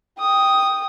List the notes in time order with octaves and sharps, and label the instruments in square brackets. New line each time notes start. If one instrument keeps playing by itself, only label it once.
[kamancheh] G5 D#6